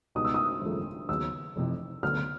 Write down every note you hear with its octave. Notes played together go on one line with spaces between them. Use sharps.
C#2 B2 G3 B3 D#4 D#6
E6
D#6
G#1 F#2 C#3 F3 A3
D#2 C#3 F#3 B3 E6
F1 F2 C3 E3
D2 D3 F#3 B3 F6